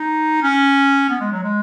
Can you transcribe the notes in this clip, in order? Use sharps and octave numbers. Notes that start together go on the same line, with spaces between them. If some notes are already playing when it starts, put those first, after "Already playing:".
Already playing: D#4
C#4
B3
G#3
F#3
G#3